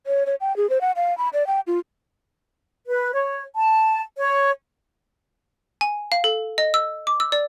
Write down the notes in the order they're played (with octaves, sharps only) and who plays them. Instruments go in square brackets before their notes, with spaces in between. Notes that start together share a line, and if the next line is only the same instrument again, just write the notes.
[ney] C#5
C#5
G5
G#4
C5
F#5
F5
B5
D5
G5
F4
[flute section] B4
C#5
A5
C#5
[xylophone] G#5
F5
A4
D#5
E6
D6
E6
D5